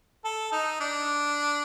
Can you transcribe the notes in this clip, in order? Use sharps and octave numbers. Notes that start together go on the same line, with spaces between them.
A4
D#4
D4